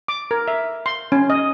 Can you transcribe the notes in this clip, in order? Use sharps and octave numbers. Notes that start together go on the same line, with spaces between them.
D6
A#4
E5
C6
C#4
D#5